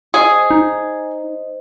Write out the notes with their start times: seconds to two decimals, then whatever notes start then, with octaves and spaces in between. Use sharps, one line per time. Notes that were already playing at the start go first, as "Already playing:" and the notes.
0.14 G#4 C5 D#5
0.51 D#4